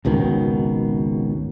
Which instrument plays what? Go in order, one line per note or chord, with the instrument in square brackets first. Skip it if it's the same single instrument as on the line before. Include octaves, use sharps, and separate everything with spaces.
[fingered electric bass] G#1 C#2 B2 D#3